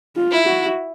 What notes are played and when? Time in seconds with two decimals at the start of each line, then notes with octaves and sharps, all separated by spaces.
0.16 F4
0.31 E4
0.47 F#4